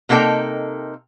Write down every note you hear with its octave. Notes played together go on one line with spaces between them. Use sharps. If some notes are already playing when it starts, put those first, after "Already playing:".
C3 A#3 D#4 A4 G5